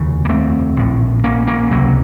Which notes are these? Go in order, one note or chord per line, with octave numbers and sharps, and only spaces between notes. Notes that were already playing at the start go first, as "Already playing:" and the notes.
Already playing: F1 D#2 C#3
A#3
A3 C4
A#1 A2
A#3 C#4
A#3 C#4
C#2 C3 F#3 A#3